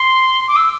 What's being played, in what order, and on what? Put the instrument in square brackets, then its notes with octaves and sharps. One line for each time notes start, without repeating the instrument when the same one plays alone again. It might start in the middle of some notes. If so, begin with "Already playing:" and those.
Already playing: [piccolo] C6
D6
E6